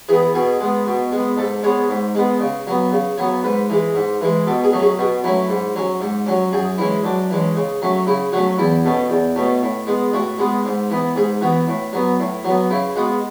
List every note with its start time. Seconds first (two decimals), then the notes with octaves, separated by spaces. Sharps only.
0.09 E3 B3 G#4
0.34 B2 G#4
0.60 G#3 B3
0.87 B2
1.12 G#3 B3
1.38 G#2 A4
1.63 G#3 B3 C#5
1.89 G#2
2.15 G#3 B3
2.40 C#3
2.67 F#3 B3
2.92 C#3
3.17 F#3 B3 C#5
3.43 G#2 B4
3.70 E3 G#3
3.95 G#2
4.21 E3 G#3
4.46 B2 A4
4.64 G#4
4.72 F#3 A3 C#4
4.81 G#4
4.98 B2 F#4
5.24 F#3 A3 C#4 E4
5.49 G#2
5.76 F#3 C#4
6.01 G#2
6.26 F#3 C#4
6.53 F#2 G#4
6.78 E3 G#3 C#4 E4
7.04 F#2 D4
7.30 E3 G#3 C#4
7.56 C#3
7.82 F#3 A3 C#4
8.07 C#3 E4
8.32 F#3 A3 C#4 F#4
8.58 E2 E4
8.85 B2 A3 C#4
9.10 E2
9.36 B2 A3 C#4
9.62 A2
9.87 G#3 B3
10.13 A2 F#4
10.39 G#3 B3
10.65 G#2
10.90 E3 B3
11.16 G#2 G#4
11.41 E3 B3 F#4
11.68 A2
11.93 F#3 B3
12.20 A2
12.45 F#3 B3
12.70 C#3 E4
12.96 G#3 B3 F#4